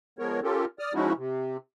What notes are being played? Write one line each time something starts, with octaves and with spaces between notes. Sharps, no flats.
F3 G#3 B3 A#4 C#5
C#4 F4 G4 A4 A#4
D5 D#6 F6
F3 G#3 C#4 D#4 E4 F#4
C3